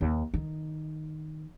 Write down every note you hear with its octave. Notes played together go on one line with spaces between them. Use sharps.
D#2
D#3